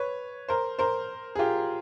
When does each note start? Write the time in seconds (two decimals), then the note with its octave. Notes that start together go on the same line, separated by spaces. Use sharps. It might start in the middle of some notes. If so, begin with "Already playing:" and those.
Already playing: B4 C#5
0.48 A#4 C5
0.79 A#4 C5
1.35 G#4
1.39 F4 G4